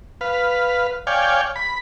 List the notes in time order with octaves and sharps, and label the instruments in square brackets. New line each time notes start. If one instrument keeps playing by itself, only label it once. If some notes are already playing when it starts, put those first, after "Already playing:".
[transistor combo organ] B4 F5
C#5 D5 F5 G5 G#5
B5